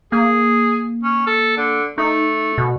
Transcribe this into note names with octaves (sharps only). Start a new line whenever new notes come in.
A#3 G#4
C#4
A4
D3
A3 D#4
B2